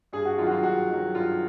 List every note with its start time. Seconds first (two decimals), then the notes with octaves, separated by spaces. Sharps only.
0.13 G2 G#4
0.25 F#4
0.38 D#3 F#3 F4
0.46 F#4
0.51 F4
0.63 G2 F#4
0.89 D#3 F#3
1.15 G2 F4